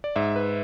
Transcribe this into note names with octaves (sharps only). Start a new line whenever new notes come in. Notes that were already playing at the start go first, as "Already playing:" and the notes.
D5
G#2 E5
B4